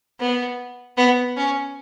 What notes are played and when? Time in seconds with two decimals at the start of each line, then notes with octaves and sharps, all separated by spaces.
0.20 B3
0.97 B3
1.37 C#4